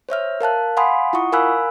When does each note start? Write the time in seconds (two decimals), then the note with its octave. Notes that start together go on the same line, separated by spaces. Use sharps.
0.09 C5 C#5 E5 F6
0.41 A#4 F5 A5 F#6
0.77 F5 F#5 G#5 B5 C6 D#6
1.13 E4 F4 F#5 C#6 D#6
1.32 A#4 F5 G#5 B5 E6 F#6